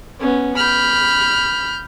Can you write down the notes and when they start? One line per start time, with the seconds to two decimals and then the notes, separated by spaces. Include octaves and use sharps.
0.20 B3 C#4
0.57 B5 F6 G6